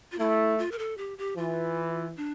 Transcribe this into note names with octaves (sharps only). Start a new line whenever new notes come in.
F4
A3 E4
F4
A#4
A4
G4
G4
E3 F4
D4